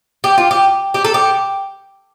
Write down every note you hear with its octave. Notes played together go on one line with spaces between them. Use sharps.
G4
F4
G4
G4
A4
G4